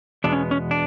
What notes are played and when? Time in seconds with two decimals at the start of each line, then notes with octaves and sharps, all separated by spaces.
0.24 E2 B2 G#3 B3 D4
0.33 C#4
0.51 C#4
0.71 D4